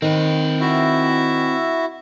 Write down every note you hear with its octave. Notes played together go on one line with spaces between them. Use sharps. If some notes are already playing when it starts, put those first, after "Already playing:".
D#3 C4 B4
E4 F#4 E5